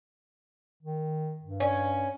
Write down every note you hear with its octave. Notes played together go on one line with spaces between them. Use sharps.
D#3
G2
C#4